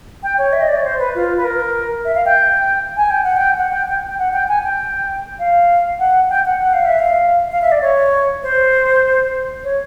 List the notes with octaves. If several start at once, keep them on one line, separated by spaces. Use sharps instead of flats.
G5
C#5
E5
D#5
D5
C#5
C5
B4
F4
B4
A#4
E5
F5
G5
G#5
G5
F#5
G5
F#5
G5
G5
G5
F#5
G5
G#5
G5
F5
F#5
G5
F#5
F#5
F5
E5
F5
F5
E5
D5
C#5
C5
C#5